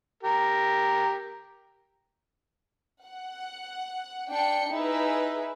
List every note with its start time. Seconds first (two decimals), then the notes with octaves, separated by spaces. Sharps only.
0.23 G4 A#4
3.05 F#5
4.29 D4 G5 C#7
4.72 D#4 E4 G#4 B4 E5